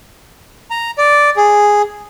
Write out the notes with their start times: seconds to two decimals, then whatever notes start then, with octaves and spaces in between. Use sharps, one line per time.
0.71 A#5
0.98 D5
1.37 G#4